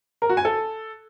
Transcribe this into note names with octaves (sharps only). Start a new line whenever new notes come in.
A#4
F#4
G#5
A4